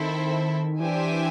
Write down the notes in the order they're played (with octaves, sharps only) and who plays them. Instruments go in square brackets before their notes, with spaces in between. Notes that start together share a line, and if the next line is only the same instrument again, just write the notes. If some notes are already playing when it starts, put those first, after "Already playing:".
Already playing: [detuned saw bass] D#3 [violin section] C4 E4 A4 C5 E5
[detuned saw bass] E3 [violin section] D4 G4 C5 E5 G#5